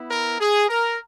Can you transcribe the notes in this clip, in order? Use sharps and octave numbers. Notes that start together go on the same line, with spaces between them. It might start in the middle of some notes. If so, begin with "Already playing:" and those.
Already playing: B3 E4
A#4
G#4
A#4